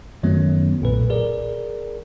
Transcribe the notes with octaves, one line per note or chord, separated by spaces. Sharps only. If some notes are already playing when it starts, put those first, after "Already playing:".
F#2 D#3 F#3 A3 B3 C#4
B1 A#2 B4
G#4 A#4 D5